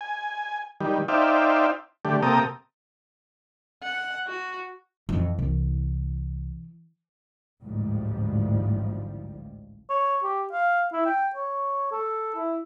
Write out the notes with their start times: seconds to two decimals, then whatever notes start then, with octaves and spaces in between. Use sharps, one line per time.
0.01 G#5
0.80 D#3 G3
1.08 D#4 C5 D5 E5 F5 G5
2.05 D3 A3 G4
2.23 C3 A#3 A4 G5 A#5 D#6
3.83 F#5
4.27 F#4
5.09 F2 E3
5.39 C2 E3
7.61 A1 D2 G#2 F3 G3
9.90 C#5
10.24 G4
10.53 F5
10.93 E4
11.06 G5
11.36 C#5
11.92 A4
12.36 E4